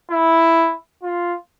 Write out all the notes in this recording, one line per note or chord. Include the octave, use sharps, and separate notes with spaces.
E4
F4